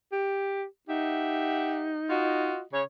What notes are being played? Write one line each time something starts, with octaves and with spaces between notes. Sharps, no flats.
G4
D#4 G4 E5 F#5
F4 F#4 D#5
C#3 C#5